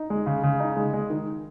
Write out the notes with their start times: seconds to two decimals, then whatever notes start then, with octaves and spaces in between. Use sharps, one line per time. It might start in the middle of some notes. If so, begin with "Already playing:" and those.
Already playing: D#4
0.10 G#3
0.26 C#3
0.43 C#3
0.60 D#4
0.77 G#3
0.93 G#3
1.10 D#3